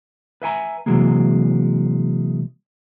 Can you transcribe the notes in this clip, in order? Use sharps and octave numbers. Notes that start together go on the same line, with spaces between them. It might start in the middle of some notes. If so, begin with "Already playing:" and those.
B4 E5 G#5 A#5
C3 E3 F#3 G#3 A#3